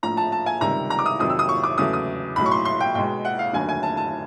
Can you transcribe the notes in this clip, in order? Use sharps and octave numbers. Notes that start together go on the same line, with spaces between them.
A#1 A2 F3 A#5
A5
A5
G#5
C#2 C3 D#3 G3 A#5
A#5
D6
D#6
F2 C3 D#3 F#3 D#6
E6
D#6
C#6
D6
E2 C#3 F#3 A3 D#6
D#6
B1 A2 F#3 B5
C#6
C6
C6
G5
B1 B2 G#3 G5
F#5
F5
F1 D#2 D3 F#3 G#5
G#5
A5
A5